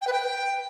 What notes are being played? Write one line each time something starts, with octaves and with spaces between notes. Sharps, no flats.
G5
B4
G5